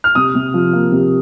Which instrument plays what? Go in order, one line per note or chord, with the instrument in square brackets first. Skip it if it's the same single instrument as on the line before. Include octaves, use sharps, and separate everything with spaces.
[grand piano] F6
C3 D#6
C3
F3
A#3
C3